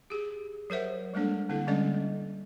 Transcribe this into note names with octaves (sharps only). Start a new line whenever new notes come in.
G4 G#4
F#3 A#4 C5 E5 F#5
G3 G#3 A#3 D4 A4
D3 A#3 C4 E4
D3 G3 G#3 C#4 D5 D#5